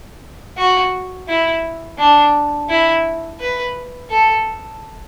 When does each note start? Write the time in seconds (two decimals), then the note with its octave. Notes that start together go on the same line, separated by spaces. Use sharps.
0.57 F#4
1.28 E4
1.98 D4
2.70 E4
3.40 B4
4.10 A4